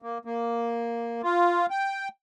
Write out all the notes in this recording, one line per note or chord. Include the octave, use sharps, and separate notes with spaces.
A#3
A#3
F4
G5